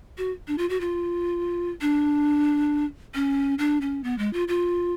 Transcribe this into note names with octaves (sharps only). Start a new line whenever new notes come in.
F#4
D4
F4
F#4
F4
D4
C#4
D4
C#4
B3
G#3
F4
F4